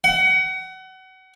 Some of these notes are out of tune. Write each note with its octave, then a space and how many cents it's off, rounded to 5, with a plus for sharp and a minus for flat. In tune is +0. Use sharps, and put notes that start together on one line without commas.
F#5 +30